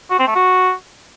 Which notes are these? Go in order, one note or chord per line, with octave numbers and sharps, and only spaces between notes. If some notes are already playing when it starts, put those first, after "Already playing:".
F#4
C4
A3
F#4